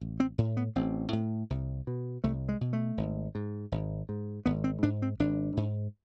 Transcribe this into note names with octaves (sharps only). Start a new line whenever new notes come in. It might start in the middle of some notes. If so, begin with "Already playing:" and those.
A1
C4
A2
B3
A1 C4
A2
C2
B2
C2 A3
G#3
B2
A3
G#1
G#2
G#1
G#2
G#1 B3
C4
G#2 D4
C4
G#1 D4
G#2